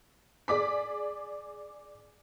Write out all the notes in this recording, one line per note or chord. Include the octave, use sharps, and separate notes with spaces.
G#4 D5 D6 B6